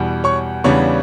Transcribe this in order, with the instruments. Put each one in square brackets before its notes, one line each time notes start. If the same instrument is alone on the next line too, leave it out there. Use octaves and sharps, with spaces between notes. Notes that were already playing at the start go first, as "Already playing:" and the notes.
Already playing: [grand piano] E2 B2 G3
C#5 C#6
E2 C#3 G3 B3 D4 C#5 C#6